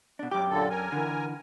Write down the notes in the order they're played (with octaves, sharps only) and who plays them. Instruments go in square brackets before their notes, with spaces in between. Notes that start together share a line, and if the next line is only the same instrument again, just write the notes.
[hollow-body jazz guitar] B2 D4
[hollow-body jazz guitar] F#2 G4 [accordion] D6
[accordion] A#2 D3 A4
A#4 G#5
[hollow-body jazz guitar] D3 E3